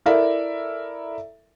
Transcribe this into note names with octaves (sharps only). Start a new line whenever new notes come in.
E4 A4 A#4 D5 E5